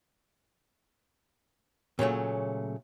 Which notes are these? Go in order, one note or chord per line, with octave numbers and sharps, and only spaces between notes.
A#2 C#3 F#3 A3